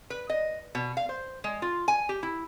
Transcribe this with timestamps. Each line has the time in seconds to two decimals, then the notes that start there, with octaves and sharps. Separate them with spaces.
0.10 B4
0.30 D#5
0.75 B2
0.97 F5
1.09 C5
1.44 G#3
1.62 F4
1.88 G#5
2.09 G4
2.23 E4